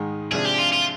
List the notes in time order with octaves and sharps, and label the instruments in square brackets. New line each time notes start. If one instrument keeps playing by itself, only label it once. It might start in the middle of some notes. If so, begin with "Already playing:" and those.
Already playing: [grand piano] G#2 D#3 G#3
[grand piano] C3 F3 G#3 D4 [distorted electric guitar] G#4
[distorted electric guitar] G4
F4
F4